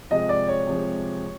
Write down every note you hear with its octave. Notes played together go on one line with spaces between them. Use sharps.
C3 F3 G#3 D#5
D5
C#5
C3 F3 G#3